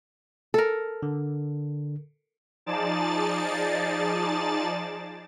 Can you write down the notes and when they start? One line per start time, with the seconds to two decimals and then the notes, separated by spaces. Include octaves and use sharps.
0.54 A4 A#4
1.03 D3
2.66 F3 D#4 G#4 D5 A5 A6